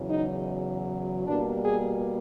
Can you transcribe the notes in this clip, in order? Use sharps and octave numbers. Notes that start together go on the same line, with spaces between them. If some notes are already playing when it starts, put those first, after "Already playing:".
Already playing: E2 C#3 F#3
D#4
B2 G3 A#3 D4
G#4